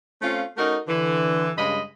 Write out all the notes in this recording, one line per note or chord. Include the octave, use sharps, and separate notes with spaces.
A3 C4 C#4 F4
A3 C#4 D#4 F#4 A#4
D3 E3
G2 C#3 G#3 D#5 B5